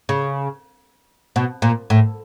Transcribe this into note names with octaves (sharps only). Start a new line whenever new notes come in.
C#3
B2
A#2
A2